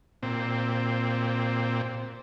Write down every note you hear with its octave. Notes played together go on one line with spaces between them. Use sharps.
A#2 C4